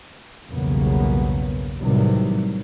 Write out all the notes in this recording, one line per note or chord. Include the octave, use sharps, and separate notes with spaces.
B1 E2 G2 C#3 A#3 B3
A2 C3 D#3 E3 F#3 G3